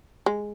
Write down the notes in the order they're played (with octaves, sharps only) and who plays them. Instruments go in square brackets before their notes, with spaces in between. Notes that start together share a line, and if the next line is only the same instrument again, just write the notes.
[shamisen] G#3